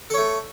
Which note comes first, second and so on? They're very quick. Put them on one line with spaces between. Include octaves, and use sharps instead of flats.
A4 C#5 A3